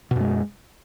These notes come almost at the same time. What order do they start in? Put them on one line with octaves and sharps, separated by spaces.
B2 F#2 G#3